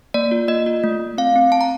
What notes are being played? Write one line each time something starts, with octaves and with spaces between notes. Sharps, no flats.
A#3 D5
F4
A#3 D#5
F4
A3
A3
C4 F5
C4
C4 A5
A#5